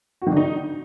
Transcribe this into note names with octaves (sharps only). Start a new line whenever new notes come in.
F#4
D#3
D3
D#4